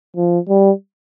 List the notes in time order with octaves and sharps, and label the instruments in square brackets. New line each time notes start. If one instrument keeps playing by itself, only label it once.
[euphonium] F3
G3